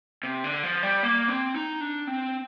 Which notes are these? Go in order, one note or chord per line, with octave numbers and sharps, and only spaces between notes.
C3
D3
F3
G3
A#3
C4
D#4
D4
C4